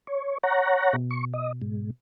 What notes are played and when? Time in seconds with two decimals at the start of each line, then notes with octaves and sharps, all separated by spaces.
0.07 C#5
0.43 C#5 F#5 A#5
0.93 B2
1.11 C#6
1.34 D#5
1.62 G#2